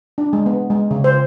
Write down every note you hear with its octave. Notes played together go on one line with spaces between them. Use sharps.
D4
G#3
B3
G#3
C#3
C5